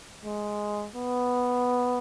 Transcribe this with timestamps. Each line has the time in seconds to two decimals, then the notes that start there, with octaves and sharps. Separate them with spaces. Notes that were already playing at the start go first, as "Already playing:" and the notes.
0.24 G#3
0.95 B3